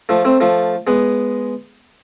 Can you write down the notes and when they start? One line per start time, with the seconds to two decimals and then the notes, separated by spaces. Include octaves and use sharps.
0.09 F3 A3
0.25 A3 C4
0.40 F3 A3
0.87 G#3 B3